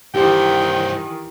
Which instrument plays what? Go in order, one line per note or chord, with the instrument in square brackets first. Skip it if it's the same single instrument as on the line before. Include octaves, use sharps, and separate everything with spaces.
[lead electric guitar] G2 C5 [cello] D#3 E3 [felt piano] G4 [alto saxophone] G5